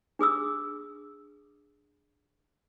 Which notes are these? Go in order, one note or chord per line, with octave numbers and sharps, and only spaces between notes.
D4 G#4 D#6 E6